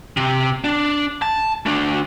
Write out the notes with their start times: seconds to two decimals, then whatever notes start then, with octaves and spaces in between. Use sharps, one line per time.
0.17 C3
0.64 D4
1.22 A5
1.66 A3 D4